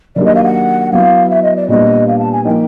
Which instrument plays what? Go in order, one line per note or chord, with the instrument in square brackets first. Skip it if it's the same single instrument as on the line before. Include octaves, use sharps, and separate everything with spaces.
[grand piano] D#3 F#3 A#3 D4 G4 [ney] D5
[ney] D#5
F5
F#5
[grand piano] F#3 B3 E4 [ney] F5
[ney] E5
D#5
D5
[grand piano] A#2 G3 B3 D4 [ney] D#5
[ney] F5
A5
G#5
[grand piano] F3 A#3 D#4 [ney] G5